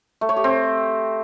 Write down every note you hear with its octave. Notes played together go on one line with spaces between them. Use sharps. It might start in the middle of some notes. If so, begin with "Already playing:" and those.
A3
C#5
G4
C4